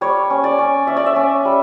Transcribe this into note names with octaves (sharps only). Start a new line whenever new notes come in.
G3 C#5
C#4
D5
C#4
C#4 E5
D5
E5
C#4
G3